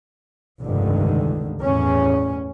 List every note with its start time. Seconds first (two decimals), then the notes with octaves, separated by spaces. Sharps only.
0.61 F1 C#2 G2 D3 D#3
1.61 E2 A2 C#4